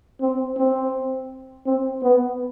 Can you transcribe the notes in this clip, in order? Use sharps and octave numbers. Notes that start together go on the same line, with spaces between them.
C4
C4
C4
B3